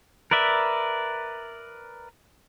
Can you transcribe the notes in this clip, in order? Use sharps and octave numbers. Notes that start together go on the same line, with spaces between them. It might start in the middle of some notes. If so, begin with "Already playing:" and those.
A#4 B4 D5 E5